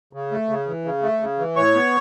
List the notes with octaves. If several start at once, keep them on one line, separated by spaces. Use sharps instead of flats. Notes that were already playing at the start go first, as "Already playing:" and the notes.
C#3
A3
C#3
E3
C#3
A3
C#3
E3
A2 C#5 C#6
B3